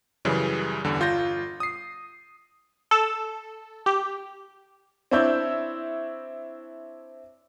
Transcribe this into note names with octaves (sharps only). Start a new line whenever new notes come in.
F#2 C#3 E3 G3
E2 G2 D3
G1 F4 G6 A#6
D#6 C7
A4
G4
C4 D4 E4 C#5 G6